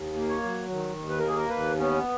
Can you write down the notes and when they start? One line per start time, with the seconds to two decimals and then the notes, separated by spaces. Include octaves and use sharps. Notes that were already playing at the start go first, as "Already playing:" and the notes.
Already playing: D#2
0.16 A#3
0.29 C#5
0.43 F#3
0.69 D#3
0.96 D#2
1.10 B4
1.18 A#4
1.23 A#3 G#4
1.37 A#4
1.49 D#2 B4
1.77 B3 C#4